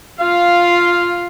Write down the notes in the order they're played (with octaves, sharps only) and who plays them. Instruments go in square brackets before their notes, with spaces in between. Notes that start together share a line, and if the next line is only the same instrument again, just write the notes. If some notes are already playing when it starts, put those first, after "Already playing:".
[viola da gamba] F4 [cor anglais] F5